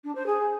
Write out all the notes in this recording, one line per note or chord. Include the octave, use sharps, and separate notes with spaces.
D4
C5
G#4